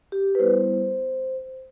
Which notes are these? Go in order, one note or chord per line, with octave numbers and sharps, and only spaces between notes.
G4
B4
G3 B3 E4 C5